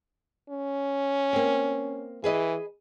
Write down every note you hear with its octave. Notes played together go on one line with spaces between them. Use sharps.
C#4
A#3 C4
E3 G#4 B4 D#5